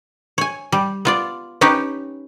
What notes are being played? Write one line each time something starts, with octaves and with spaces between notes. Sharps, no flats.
C#5 G#5
G3
B3 F4 D5
C#4 D#4 G4 B4 C#5